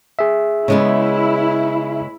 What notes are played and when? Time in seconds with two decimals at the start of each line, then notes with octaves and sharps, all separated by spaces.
0.19 G#4 E5
0.68 C#3 G#3 B3 E4